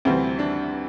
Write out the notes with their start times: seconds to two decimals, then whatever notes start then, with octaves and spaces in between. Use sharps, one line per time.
0.05 D2 C3 E3 G3 C4
0.39 D4